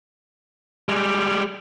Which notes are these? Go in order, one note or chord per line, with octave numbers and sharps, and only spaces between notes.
G3 G#3